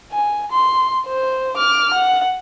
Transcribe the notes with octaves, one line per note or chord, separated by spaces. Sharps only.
G#5
C6
C5
D6 F6
F#5